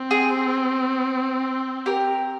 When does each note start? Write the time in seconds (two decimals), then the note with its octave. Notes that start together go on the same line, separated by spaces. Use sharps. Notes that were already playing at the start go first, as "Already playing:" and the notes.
Already playing: C4
0.11 G#4
1.86 G4 A#4